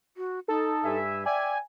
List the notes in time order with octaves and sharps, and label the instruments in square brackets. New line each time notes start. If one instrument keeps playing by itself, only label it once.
[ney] F#4
[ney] D#4 [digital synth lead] A4
[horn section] G2 E5 G#5
[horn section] D5 E5 [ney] G5 [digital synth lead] G#5